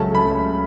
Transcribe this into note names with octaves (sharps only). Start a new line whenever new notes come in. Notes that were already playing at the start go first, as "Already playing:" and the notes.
Already playing: C#2 C#3 F#3 A3 C#4 A5
B5